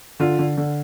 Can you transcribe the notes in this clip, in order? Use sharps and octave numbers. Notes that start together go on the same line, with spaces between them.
D3 F4
D3
D3